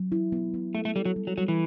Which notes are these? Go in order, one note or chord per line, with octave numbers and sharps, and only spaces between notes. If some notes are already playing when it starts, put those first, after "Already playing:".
Already playing: F#3
E4
B3
B3
A3 A4
A3
G3 A4
F#3
G3
F#3
F#3 G3
E3